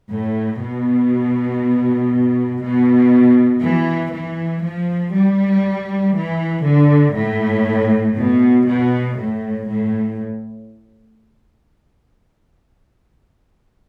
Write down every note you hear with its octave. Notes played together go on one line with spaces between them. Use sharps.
A2
B2
B2
E3
E3
F3
G3
E3
D3
A2
B2
B2
A2
A2